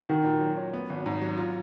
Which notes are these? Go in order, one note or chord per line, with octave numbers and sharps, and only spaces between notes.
D#3 F#4
A#2
F#3
C#4
B3
G#1
G#2
F#3
F4